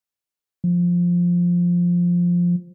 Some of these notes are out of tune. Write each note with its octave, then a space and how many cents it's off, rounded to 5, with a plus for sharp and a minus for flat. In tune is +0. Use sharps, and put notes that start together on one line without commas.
F3 +5